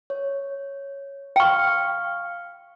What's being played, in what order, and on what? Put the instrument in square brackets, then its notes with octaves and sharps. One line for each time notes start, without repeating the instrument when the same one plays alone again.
[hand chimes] C#5
[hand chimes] F5 F6 [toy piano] G5 C#6